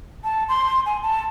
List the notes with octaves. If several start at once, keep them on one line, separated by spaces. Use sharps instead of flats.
A5
C6
G#5
A5